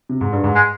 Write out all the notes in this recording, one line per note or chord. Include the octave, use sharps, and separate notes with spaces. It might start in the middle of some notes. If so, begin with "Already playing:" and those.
C3
G#2
G2
G#2
G#3